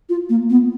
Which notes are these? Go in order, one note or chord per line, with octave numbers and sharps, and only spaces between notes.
F4
A#3
B3